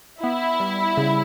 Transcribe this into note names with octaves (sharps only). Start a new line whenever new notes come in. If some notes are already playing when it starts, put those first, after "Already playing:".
B3 E4
G3
C#3